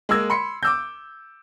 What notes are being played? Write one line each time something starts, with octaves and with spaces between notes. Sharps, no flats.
G#3 A#3 A#4 E6 G#6
B5 C6 C#7
D6 E6 G6